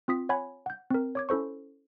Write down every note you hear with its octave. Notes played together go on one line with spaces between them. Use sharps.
C4 F4 D#6 B6
C#5 F#5 G#5 B5 G#6
F#5 G6
C4 A#4
C#5 D6 G#6
C#4 E4 A4 C5 C#6